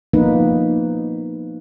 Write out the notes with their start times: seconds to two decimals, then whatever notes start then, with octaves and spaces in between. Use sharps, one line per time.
0.14 F3 A#3 B3 D#4 B4